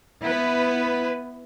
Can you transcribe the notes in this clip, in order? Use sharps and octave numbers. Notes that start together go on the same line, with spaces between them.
B3 E4 B4